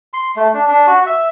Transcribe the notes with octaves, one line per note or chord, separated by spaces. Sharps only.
C6
A3
D4
D4
F#4
E5